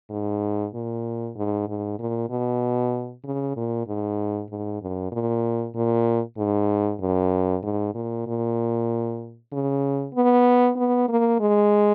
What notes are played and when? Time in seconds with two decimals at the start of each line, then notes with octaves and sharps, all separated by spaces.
0.10 G#2
0.74 A#2
1.36 G#2
1.68 G#2
1.99 A#2
2.30 B2
3.24 C#3
3.56 A#2
3.87 G#2
4.50 G#2
4.82 F#2
5.12 A#2
5.75 A#2
6.37 G#2
7.00 F#2
7.63 G#2
7.94 A#2
8.27 A#2
9.52 C#3
10.14 B3
10.76 B3
11.09 A#3
11.40 G#3